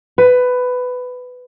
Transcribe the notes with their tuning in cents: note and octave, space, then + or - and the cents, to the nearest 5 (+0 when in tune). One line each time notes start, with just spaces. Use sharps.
B4 +15